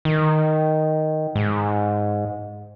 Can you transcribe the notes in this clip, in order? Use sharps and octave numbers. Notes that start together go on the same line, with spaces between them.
D#3
G#2